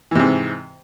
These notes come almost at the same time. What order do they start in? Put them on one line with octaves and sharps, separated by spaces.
E3 C3 G#2